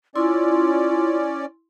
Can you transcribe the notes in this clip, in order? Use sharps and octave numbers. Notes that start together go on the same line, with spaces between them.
C#4 E4 F4 D5 C6